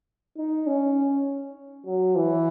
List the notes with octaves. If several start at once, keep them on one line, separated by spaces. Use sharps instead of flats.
D#4
C#4
F#3
E3